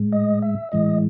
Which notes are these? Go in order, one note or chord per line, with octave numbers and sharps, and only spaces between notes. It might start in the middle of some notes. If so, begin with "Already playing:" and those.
Already playing: A2 G#3
D#5
E5
A2 E3 G#3 D#5